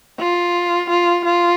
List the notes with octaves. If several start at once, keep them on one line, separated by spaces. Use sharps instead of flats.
F4
F4
F4